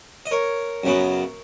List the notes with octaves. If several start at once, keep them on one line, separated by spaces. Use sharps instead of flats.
D#5
A#4 C#5
F#2 C#3 F#3 B3